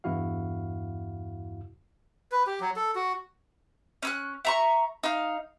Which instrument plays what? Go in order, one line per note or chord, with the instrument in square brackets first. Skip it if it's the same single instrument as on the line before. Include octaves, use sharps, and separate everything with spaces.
[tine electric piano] E2 G2 E4 F#4 F5
[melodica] B4
G4
F#3
A4
F#4
[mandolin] C#4 E6 F#6
E5 A#5 C#6
D#4 F5